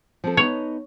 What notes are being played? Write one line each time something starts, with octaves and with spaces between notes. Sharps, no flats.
F3 C4 A4
B3 D#4 C#5